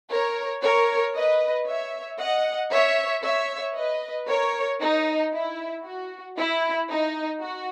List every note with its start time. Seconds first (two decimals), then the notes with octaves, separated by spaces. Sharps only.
0.10 A#4 C#5
0.62 A#4 C#5
1.14 B4 D#5
1.66 C#5 E5
2.19 D#5 F#5
2.72 C#5 E5
3.23 C#5 E5
3.75 B4 D#5
4.28 A#4 C#5
4.80 D#4
5.33 E4
5.84 F#4
6.38 E4
6.89 D#4
7.41 F#4